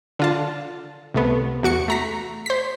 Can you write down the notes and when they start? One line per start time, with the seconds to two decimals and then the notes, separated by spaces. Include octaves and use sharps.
0.19 D3 F4 A5
1.14 C2 A3 B3
1.63 E2 F#4 C#6 C#7
1.88 A3 A#5 B6
2.46 C5 B6